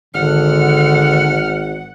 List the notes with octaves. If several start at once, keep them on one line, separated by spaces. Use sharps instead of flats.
G#1 D3 F#5 F6